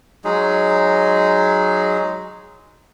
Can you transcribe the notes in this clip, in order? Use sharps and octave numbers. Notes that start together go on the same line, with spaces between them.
F#3 G#3 D#4 G#4